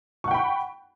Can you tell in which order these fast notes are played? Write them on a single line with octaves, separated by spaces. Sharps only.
C#6 F#5 G5 B5